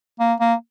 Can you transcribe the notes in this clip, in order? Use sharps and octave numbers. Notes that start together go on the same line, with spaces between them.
A#3
A#3